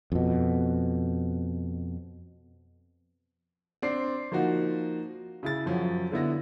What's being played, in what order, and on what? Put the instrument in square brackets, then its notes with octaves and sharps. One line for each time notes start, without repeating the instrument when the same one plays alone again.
[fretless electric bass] F2 B2
[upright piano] C4 D4 D5 C7
F3 A#3 D#4 F#4
C#3 E4 A6
F#2 F3 F#3
D3 B3 E4 A#6